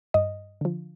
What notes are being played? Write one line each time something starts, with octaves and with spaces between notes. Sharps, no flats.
G2 D#5
D3 F3